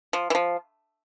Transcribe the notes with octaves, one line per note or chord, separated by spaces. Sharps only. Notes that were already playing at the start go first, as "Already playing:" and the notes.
F3
E3
F3